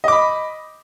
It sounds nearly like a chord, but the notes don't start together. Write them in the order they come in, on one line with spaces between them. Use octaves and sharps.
D#5 D6 B5